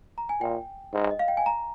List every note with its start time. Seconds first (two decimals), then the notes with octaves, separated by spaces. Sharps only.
0.18 A#5
0.29 G#5
0.41 A#2 G5
0.93 G#2
1.11 D#5
1.19 F5
1.28 G5
1.37 G#5
1.46 A#5